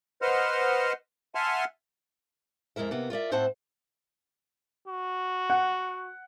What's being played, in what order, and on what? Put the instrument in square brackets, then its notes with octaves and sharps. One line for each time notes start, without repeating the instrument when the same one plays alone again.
[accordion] B4 C5 D#5 F#5 C6 F6
E5 F#5 G#5 A5 C6 F6
[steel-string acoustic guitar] F2 G#3 E4 A#4 E5
C3 A#3 B3
F4 A#4 D5 E5
A2 C4 C5 E5 F#5 A5
[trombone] F#4
[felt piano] F#5